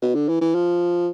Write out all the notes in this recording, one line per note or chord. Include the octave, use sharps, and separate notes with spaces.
B2
D3
E3
E3
F3